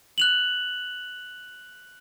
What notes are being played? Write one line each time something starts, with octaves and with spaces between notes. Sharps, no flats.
F#6 F7 F#7